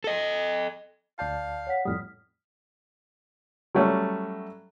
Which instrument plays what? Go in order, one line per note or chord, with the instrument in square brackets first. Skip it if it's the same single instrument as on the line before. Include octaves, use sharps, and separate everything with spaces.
[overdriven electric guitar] A4 D#5
[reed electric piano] D2 D5 A5 [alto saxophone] F5 [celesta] G6
[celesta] C#5 F#5 B6
[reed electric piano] F2 A2 G3 [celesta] D#6 F6 B6
[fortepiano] F#3 G3 A3 C#4